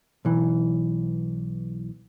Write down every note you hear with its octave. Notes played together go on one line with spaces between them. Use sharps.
B1 E3